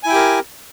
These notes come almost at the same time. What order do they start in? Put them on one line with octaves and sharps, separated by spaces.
G#5 E4 G5 G4 A#4